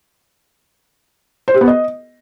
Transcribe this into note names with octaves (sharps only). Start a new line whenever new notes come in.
C5
G4
B3
D#5